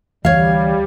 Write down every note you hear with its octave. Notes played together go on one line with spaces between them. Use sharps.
D2 E3 G3 C#5 F5